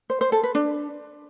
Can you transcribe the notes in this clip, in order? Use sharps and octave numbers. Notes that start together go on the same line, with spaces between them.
C5
C5
A4
B4
D4